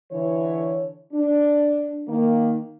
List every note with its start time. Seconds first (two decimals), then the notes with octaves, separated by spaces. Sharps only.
0.12 D3 E3 C#5
1.13 D4
2.07 D#3 A#3